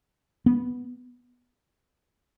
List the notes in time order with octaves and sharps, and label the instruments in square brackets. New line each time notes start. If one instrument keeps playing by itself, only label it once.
[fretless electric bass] B3